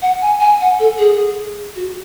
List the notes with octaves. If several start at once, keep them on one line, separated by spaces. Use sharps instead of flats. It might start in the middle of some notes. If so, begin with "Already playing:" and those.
F#5
G#5
G#5
F#5
A4
G#4
F#4